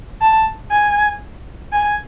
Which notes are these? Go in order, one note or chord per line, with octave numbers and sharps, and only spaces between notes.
A5
G#5
G#5